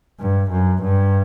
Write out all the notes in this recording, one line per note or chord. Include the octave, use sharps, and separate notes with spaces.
G2
F#2
G2